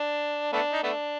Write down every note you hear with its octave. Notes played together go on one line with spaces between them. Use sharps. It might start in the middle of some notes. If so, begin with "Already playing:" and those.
Already playing: D4
A3 B3 D4
D#4
A3 B3 D4